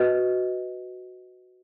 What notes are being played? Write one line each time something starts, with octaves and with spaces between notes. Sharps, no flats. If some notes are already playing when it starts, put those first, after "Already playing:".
Already playing: F#4 B4 D#5